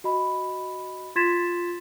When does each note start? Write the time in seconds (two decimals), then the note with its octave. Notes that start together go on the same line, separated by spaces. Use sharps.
0.04 F#4 D#5 B5
1.16 F4 C6 G#6 A6 B6 E7